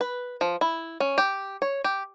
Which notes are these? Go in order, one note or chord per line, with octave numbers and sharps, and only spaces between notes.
B4
F3
E4
C#4
G4
C#5
G4